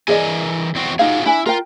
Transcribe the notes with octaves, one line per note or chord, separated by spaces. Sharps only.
E3 G#4 A#4 D5 D#5 G#5
E2 C4 F#4
D#4 F4 F#4 G#4 F5
D4 E4 G#5
F4 A#4 G5